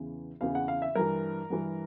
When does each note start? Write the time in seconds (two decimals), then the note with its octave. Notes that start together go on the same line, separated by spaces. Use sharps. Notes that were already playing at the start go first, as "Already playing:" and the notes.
Already playing: E2 C#3 E3
0.41 E2 C#3 E3 F5
0.55 F#5
0.68 F5
0.82 E5
0.95 G2 E3 A#4
1.50 G2 E3